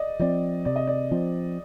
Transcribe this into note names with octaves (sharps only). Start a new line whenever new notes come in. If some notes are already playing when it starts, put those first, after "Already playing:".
Already playing: D5 D#5
F3 C4 D5
C3 D5
D#5
D5
F3 C4